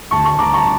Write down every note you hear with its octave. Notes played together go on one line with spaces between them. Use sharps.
D2 A5 C#6
A5 C#6
D2 A#5 D6
A5 C#6